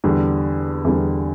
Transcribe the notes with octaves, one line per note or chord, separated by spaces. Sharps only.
E2 D3 G3
E2 D3 G3